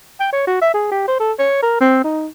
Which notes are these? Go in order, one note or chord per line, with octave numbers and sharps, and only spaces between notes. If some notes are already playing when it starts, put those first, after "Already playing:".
G5
C#5
F#4
E5
G#4
G4
C5
A4
C#5
A#4
C4
D#4